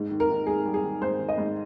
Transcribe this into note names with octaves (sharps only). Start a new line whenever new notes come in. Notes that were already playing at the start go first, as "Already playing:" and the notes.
Already playing: G#2
D#3
A#4
D#3
G#2 G#4
G3
G#4
D#3
G#2 C5
D#3
D#5
G#2